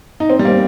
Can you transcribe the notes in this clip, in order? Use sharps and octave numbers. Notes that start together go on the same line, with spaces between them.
D#4
C4
G3
A#3